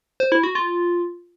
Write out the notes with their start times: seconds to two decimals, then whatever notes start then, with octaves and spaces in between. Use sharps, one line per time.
0.20 C5
0.32 E4
0.44 F#4
0.55 F4